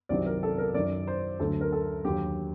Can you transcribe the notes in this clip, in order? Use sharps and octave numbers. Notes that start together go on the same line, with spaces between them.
C2 C3 D#3 F#3 D5
A#4
A4
A#4
F#2 D#3 F#3 D5
C5
D2 D3 F#3 A4
A#4
A4
D#2 D3 F#3 G4